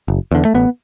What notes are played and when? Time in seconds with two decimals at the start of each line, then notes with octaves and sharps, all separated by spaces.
0.08 F#1
0.31 E2 D3
0.45 A3
0.54 A1 B3